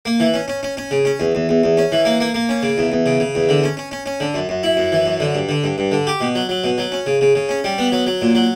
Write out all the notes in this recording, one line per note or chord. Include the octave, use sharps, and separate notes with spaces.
A#3
E3
C#4
C#4
C#4
C#4
C#3
C#4
E2
E2
E2
E2
C#4
E3
A#3
A#3
A#3
C#4
C#3
E2
E2
C#3
C#3
E2
D3
C#4
C#4
C#4
C#4
D3
F#2
F#2
E4
F#2
E3
F#2
D3
G2
D3
G2
G2
D3
G4
B2
F#3
F#3
B2
F#3
C#4
C#3
C#3
C#3
C#4
G3
B3
F#3
F#3
A#2
F#3